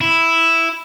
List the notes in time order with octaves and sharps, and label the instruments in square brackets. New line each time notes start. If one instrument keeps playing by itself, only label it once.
[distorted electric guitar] E4